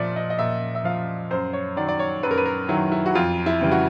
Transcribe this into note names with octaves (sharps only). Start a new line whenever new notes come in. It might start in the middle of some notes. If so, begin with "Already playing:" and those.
Already playing: A#2 F3 D5 E5
D#5
D#5
A#2 E5
E5
F3 F5
F#2 C5
C#5
D#3 F#3 D5
D5
C#5
F#2 B4
A#4
B4
A#4
D#3 F#3 E4
E4
F#4
F2 F4
E4
C#3 E3 G3
F#4